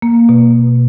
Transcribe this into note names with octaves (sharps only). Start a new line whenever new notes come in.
A#3
B2